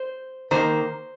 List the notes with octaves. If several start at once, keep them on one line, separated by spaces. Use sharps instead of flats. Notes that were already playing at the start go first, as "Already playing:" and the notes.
Already playing: C5
D#3 A#3 C5